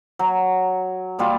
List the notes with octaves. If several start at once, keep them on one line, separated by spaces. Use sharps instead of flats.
F#3
A#2 G3 F4